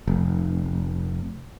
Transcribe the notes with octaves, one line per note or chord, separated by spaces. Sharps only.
F1